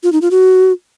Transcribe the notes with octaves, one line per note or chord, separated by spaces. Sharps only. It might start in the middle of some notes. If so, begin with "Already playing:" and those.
F4
D#4
F4
F#4